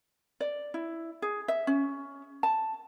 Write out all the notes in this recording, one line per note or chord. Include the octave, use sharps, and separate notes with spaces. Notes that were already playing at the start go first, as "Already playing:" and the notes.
D5
E4
G#4
E5
C#4
A5